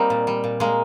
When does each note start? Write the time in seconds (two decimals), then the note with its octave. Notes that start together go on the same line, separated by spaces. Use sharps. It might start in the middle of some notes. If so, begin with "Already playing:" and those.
Already playing: G3 A#3 C4 D#4
0.10 A#2
0.27 G3
0.44 A#2
0.60 G#3 A#3